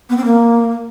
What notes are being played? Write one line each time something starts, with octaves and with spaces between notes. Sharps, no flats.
B3
C4
A#3